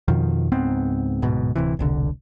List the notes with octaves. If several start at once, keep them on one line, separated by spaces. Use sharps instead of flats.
F2 B2 D#3 F3
C#2 G#2 B3 C4
D1 G#2 B2
D1 C3 E3
E1 C2 D3